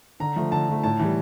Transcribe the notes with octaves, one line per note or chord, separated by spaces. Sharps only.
D3 A#5
F3 A3
D3 A5
F3 A3
A2 A5
E3 G3